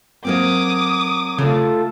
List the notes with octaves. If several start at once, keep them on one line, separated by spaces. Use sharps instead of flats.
F#3 A#3 C4 D6 D#6
C#3 A3 F4 A4